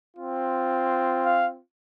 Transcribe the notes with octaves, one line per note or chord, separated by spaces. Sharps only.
C4 F4
F5